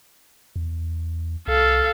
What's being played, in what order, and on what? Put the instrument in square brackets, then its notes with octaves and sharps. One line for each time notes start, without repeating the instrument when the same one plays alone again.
[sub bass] E2
[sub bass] C2 [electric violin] A4 F5